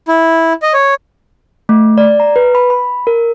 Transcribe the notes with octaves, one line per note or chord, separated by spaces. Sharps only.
E4
D#5
C#5
A3
D5
A#5
B4
B5
B5
A#4